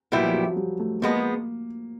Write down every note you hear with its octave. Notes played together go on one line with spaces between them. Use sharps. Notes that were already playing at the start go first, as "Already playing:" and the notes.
A#2 F#3 G3 B3 E4 G4
F3
F#3
F#3
G3
A3
F3 G#3 A#3 B3